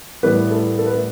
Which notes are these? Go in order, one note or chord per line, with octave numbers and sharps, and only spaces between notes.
A2 E3 G3 B3 B4
A3 A4
A4
B4
A3 A4